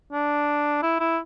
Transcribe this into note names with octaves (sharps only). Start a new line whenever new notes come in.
D4
E4
E4